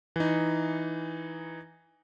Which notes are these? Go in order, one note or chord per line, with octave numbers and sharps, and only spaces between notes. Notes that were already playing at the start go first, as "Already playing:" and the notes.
E3 D#4